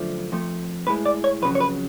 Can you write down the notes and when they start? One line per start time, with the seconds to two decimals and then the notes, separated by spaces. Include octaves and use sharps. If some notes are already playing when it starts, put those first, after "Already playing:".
Already playing: F#2 D3 F3 A3
0.32 F2 F3 A3
0.87 A2 G#3 B4
1.06 D5
1.24 C#5
1.42 F2 C#3 F#3 B4
1.55 C#5
1.60 B4